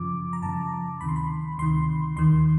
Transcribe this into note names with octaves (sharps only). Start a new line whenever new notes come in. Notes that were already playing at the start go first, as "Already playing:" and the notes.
Already playing: F#2 C#3 F3 D6
A#5
F#2 C#3 F3 A5
D2 C3 D#3 B5
C6
B5
D2 C3 D#3 C6
D#2 D#3 C6